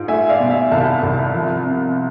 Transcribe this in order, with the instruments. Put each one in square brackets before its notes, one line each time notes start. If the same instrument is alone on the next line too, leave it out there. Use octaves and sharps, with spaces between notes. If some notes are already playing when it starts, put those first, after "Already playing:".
Already playing: [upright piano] G#2 F4
A3 E5 G#5
D5 F5
B2
E5
C2 F5 A5
C2
F3
C3